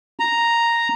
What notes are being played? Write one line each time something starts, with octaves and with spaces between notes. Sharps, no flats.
A#5